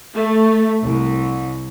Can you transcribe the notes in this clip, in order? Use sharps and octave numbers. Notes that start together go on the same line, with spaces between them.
A3
C2